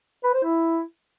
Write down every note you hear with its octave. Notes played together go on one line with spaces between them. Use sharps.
B4
C5
E4